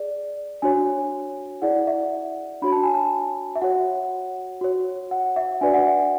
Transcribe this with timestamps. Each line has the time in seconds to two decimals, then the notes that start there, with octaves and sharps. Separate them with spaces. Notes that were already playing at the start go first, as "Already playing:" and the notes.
Already playing: G#4 D5
0.62 D4 F#4 C#5 G#5
1.62 E4 G#4 D5 F#5
1.87 E5
2.62 D4 F#4 C#5 B5
2.72 A5
2.83 G#5
2.94 A5
3.56 E5
3.61 F#4 C#5 F#5
4.61 F#4 C#5
5.11 F#5
5.36 E5
5.61 D4 F#4 B4 D5 G#5
5.74 F#5
5.87 E5
5.99 E5